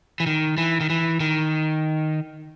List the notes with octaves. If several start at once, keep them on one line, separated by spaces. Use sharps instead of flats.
E3
D#3
E3
D#3
E3
D#3